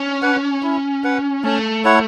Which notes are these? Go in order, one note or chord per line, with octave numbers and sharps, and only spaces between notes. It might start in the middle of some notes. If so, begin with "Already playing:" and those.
Already playing: C#4
B4 F#5
E4
B4 F#5
A3 C#4
E4 C#5 F#5